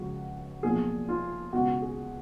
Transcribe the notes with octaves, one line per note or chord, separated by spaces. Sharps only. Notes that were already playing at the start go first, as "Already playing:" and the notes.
Already playing: C#2 C#3 F3 F#4
B1 A#2 F3 G#4
F4
C#2 B2 F#4
G#4